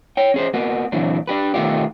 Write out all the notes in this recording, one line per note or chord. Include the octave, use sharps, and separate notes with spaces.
C#5 G5
C#4 G#4 C5
A#3 B3 F#4
A#2 D3 E3 F#3 C4 D4
D4 G4 B4
B2 D#3 A3 B3 F4 G4